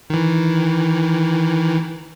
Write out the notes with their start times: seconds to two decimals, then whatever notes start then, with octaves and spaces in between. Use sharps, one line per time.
0.10 D#3 E3